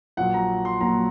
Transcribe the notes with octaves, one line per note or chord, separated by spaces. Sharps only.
A#1 A#2 F#3 F#5
A#5
C6
A#1 A#2 F#3 A#5